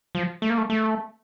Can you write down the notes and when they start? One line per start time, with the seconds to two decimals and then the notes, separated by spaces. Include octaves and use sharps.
0.15 F3
0.42 A3
0.50 A#3
0.58 A3
0.70 A3